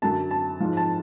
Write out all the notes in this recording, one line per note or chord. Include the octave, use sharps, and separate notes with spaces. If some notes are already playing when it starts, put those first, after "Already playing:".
F#2 D3 F#3 A5
A5
G#2 F3
A5